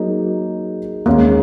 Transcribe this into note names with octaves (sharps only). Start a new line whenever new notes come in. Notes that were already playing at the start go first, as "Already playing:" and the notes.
Already playing: F#3 A#3 D#4 G#4
D#2 D#3 G#3 A#3 C#4